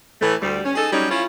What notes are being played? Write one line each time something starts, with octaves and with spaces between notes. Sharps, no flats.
A2 E3 A3
D2 G3
C#4
D#4 G#4 A4
F#3 G3 C#4 D#4
C#4 E4 F4